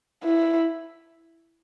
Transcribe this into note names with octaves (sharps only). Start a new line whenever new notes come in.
E4